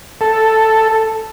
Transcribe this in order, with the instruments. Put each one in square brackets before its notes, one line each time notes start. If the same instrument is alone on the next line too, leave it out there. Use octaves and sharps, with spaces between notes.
[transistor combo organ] A4